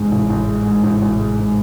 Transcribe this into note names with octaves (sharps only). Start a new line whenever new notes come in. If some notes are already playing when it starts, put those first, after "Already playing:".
Already playing: A1 G#2 G#3
A1
A1
G#3
G#2
A1
A1
G#3
G#2